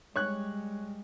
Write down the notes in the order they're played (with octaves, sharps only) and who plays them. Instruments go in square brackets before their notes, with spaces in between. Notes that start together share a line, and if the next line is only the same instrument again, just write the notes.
[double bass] G3 G#3 [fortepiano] C#5 C#6 F#6